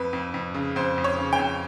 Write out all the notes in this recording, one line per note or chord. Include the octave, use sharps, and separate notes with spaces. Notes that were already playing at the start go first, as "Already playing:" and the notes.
Already playing: F2 B4
F2
F2
C#3
F2 C5
F2
C#5
C#3
G5
F2